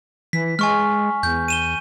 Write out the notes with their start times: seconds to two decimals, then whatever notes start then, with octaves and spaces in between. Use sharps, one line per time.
0.33 E3 B6
0.59 G#3 G#5 C#6 F6
1.23 E2 G6
1.48 D#7 E7 G7